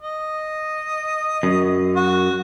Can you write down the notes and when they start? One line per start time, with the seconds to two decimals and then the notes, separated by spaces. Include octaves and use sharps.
0.02 D#5
1.43 F#2
1.96 F#4